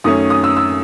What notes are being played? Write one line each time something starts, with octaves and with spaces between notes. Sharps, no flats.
F#2 D#3 A3 C#4 D#6
D#6
E6
E6